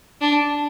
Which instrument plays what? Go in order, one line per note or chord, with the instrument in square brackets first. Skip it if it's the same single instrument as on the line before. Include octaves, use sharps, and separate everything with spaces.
[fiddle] D4